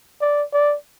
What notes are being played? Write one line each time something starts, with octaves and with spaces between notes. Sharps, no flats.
D5
D5